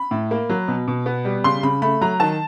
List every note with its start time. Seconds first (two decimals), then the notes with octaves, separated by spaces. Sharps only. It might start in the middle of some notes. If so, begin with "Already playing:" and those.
Already playing: B5
0.11 A2
0.31 A#3
0.49 F#3
0.68 B2
0.88 B2
1.06 B3
1.25 G3
1.44 C#3 C6
1.63 C#3 B5
1.82 A3 B5
2.01 F#3 A#5
2.20 D#3 A5